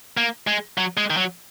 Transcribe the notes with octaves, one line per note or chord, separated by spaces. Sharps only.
A#3
G#3
F#3
G#3
D#3
F#3